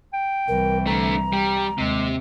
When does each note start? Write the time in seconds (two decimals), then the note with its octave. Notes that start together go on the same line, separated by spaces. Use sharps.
0.13 G5
0.48 C2 E3 A#4
0.87 D3 A3 A#5
1.33 G3 G5
1.78 D#2 C3 G#3